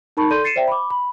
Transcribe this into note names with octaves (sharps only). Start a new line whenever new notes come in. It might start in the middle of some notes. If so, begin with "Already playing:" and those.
D#4 A#4 A5 B5 C#6
A4 D5 C6 G6 D#7
A6 C7 C#7 D#7 E7
C5 D5 E5 G5
B5 D6
B5